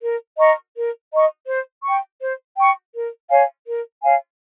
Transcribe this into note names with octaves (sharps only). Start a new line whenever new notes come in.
A#4
D#5 A#5 C#6
A#4
D#5 A#5 C#6
C5
G5 C#6
C5
G5 C#6
A#4
C#5 F5 G#5
A#4
C#5 F5 G#5